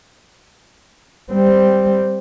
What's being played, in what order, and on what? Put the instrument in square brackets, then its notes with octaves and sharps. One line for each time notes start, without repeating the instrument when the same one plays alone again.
[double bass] G3 C4